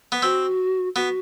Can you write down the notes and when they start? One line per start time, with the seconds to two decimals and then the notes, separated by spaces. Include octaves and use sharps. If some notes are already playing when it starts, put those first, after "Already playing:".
0.12 B3
0.22 C4 F#4
0.96 B3 F#4